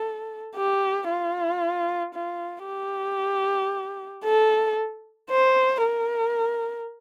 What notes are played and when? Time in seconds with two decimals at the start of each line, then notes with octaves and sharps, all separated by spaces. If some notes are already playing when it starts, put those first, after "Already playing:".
Already playing: A4
0.56 G4
1.09 F4
2.14 F4
2.67 G4
4.25 A4
5.30 C5
5.82 A#4